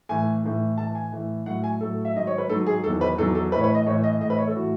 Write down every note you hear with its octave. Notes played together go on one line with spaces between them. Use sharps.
A2 E3 G#5
A2 E3
A2 E3 A5
G#5
A2 E3
A2 F#3 F#5
G#5
A2 F#3 A4
E5
G#2 D#3 F#3 D#5
C#5
B4
G#2 D#3 F#3 A4
G#4
E2 D#3 F#3 A4
B4
E2 D#3 F#3 A4
A4
A2 E3 B4
C#5
B4
D#5
A2 E3 C#5
D#5
A2 E3 D#5
B4
C#5
A4
A2 E3 F#4